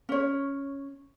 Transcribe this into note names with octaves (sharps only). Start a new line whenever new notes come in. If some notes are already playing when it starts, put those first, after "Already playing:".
C#4 C#5